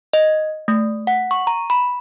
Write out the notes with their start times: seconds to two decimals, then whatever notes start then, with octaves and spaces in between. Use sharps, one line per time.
0.13 D#5
0.68 A3
1.07 F#5
1.31 C#6
1.47 A#5
1.70 B5